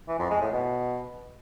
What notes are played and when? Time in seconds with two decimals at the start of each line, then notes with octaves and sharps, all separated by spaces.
0.08 E3
0.19 F2
0.30 G#3
0.41 A2
0.52 B2